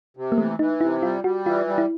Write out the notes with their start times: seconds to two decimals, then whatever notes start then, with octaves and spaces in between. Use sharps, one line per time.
0.17 C3
0.32 A#3
0.38 E3 A3
0.59 E3 D#4
0.81 C3 E4
1.03 G3 F4
1.24 G3 F#4
1.45 E3 F4
1.67 G3
1.78 E4